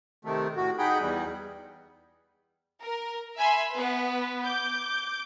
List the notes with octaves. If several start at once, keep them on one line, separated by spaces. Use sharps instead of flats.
C3 D#3 A3
A2 F#4
D#4 G#4 F#5 G5 B5
E2 G3
A#4
E5 G#5 B5 C6
B3 B4
D6 G6